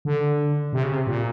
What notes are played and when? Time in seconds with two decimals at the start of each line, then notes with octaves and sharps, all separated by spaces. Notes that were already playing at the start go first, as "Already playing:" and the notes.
0.05 D3
0.73 C3
0.83 C#3
0.93 C3
1.07 A#2